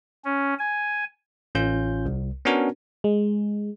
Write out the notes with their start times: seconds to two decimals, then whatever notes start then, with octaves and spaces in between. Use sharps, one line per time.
0.25 C#4
0.59 G#5
1.55 A1 C#4 F4 G6
2.06 C2
2.45 B3 C#4 D4 F#4 A#4
3.04 G#3